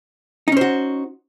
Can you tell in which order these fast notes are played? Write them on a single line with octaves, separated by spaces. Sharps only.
D#4 C#4 C5 F#4